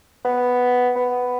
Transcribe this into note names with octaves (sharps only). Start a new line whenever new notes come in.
B3
B3